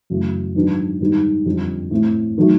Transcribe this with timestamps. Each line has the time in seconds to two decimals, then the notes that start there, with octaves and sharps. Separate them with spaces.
0.10 F#2 C#3 E3 A3
0.55 G#2 D#3 F#3 B3 D4
1.00 G#2 D#3 G3 B3 D#4
1.46 F2 D3 G3
1.91 A2 E3 A3 C4
2.38 D#3 F#3 A3